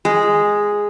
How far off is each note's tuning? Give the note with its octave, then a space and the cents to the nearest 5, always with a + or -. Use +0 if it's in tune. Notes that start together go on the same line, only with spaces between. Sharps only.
G#3 -5